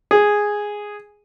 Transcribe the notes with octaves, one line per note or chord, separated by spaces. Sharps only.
G#4